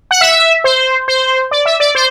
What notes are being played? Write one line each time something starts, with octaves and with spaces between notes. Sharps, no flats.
F#5
E5
C5
C5
D5
E5
D5
C5